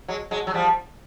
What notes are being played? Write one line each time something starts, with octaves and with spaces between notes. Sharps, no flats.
F#3 G#3
F#3 G#3
F#3
F3 G3